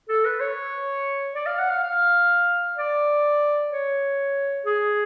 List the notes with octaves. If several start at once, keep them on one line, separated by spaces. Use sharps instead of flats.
A4
B4
C#5
D5
F5
F#5
F5
F5
D5
C#5
G#4